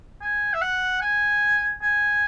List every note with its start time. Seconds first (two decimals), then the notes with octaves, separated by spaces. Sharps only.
0.22 G#5
0.54 E5
0.62 F#5
1.01 G#5
1.82 G#5